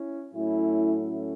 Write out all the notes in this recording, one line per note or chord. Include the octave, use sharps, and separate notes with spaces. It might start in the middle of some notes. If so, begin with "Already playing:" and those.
Already playing: C#4 E4
A2 F#3 A3 C#4 E4
C#4